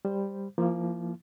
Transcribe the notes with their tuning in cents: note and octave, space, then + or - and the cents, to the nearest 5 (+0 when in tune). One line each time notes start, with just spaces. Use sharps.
G3 +10 C5 +0
F3 -20 A#3 +0 E4 +0